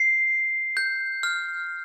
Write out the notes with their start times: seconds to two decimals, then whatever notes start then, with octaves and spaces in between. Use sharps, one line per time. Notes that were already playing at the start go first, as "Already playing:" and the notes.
Already playing: C7
0.77 G6
1.23 F6